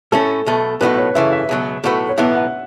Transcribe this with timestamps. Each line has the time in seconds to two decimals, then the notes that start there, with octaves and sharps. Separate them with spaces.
0.12 A2 A3 C#4 A4
0.46 B1 B2 A3
0.81 B1 A2 A3 F#4 B4
0.98 C#5
1.15 F#2 C#3 E3 A3 E5
1.32 E5
1.49 C#2 B2 F#3
1.84 B1 A2 A3 F#4 B4
2.09 C#5
2.18 B1 A2 E3 B3 E5
2.35 F#5